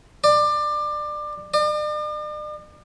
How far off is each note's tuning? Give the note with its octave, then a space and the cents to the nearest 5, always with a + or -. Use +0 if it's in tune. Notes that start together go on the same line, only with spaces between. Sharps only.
D5 +25
D5 +45